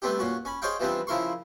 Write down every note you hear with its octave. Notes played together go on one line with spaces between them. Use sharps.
G3 A3 B3 C4 D4 G4
A#2 C#4 F#4
C#4 B5
G#4 C5 C#5 D#5 F5 G5
E3 F3 G3 B3 C4 D4
C#3 F3 E4 A#4 C6 C#6